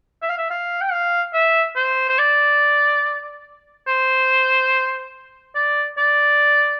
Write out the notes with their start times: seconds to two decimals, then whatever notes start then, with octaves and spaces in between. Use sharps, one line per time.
0.22 E5
0.29 F5
0.37 E5
0.50 F5
0.81 G5
0.92 F5
1.34 E5
1.76 C5
2.09 C5
2.18 D5
3.87 C5
5.55 D5
5.98 D5